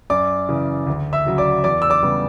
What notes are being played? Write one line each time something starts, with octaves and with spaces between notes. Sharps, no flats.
F#2 D5 D6
C#3 E3
D2
E5 E6
C#3 F#3
D5 D6
E2 D5 D6
E6
D5 D6
C#3 G3 B3